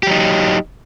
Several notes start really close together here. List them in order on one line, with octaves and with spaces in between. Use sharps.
G4 F#3 D#4